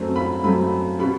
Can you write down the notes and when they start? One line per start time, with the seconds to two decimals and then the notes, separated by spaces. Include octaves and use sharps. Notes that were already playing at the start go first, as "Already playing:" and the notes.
Already playing: F#2 F#3 A3 C4
0.16 B5
0.44 F#2 F#3 A3 C4 B5
0.99 B2 G3 B3 B5